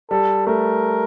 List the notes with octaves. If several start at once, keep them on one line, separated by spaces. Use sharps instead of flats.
G3 A4
A3 A#4